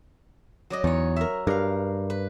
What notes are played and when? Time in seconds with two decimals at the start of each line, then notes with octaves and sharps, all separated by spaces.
0.70 F#3 D5 D#5
0.84 E2 D#4 C#5
1.16 A#4 E5
1.47 G2 A#4 F5
2.10 B4